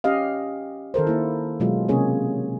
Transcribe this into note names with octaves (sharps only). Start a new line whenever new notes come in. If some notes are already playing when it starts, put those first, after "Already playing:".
C#4 G4 D#5 F5
D#3 A4 A#4 C5
A#3 E4
B2 F#3 G#3 F4
C3 A#3 C#4 G#4 C#5